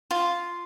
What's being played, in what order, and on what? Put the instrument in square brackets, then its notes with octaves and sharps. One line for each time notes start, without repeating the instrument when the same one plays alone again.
[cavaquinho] F4